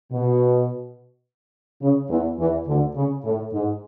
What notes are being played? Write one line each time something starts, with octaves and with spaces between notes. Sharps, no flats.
B2
C#3
E2 E3
E2 E3
D2 D3
C#3
A2
G#2